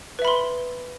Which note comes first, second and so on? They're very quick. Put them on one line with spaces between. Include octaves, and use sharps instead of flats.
B4 E5 B5 C6